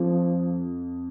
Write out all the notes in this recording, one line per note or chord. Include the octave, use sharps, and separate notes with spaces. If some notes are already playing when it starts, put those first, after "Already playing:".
Already playing: F2 F3